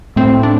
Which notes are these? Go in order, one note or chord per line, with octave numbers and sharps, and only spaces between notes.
A2 A3 C4
D4